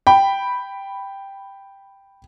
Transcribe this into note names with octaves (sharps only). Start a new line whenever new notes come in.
G5 B5